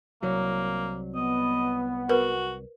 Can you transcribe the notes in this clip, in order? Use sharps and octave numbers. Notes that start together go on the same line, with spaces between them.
C2 F#3 A#3
B3 D#5
F#4 A#4 B4